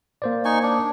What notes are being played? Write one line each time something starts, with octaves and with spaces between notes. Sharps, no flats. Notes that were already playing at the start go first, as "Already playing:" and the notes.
A#3 C5 D5
D#4 G#5 C#6
D4